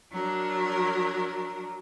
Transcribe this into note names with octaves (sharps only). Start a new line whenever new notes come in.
F#3 D4 A#4